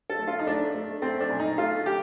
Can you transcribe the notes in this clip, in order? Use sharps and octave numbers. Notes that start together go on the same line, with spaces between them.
A4
A3
F4
D#4
A3 D4
A3
A3 C4
D4
A#2
D#4
A3 F4
D3 G4